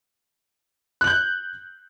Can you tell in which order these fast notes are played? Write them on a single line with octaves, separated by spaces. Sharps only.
F#6 F#7 G6